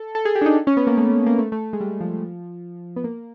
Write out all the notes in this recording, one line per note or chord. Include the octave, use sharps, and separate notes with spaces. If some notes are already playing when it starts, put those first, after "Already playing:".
Already playing: A4
A4
G#4
G4
D4
D#4
C#4
B3
A#3
A3
A#3
A3
A3
G#3
G3
F3
B3
A#3